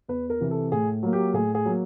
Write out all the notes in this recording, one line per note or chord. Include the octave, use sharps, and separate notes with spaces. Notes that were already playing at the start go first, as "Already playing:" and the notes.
E2 B4
A#4
C3 E3
A4
A2 G#4
F#3 A#3
G4
A2 G#4
G#4
F#3 A#3